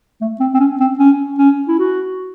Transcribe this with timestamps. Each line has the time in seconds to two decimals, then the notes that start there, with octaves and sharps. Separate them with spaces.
0.21 A3
0.40 C4
0.54 C4
0.60 C#4
0.80 C4
0.99 C#4
1.38 C#4
1.68 E4
1.79 F#4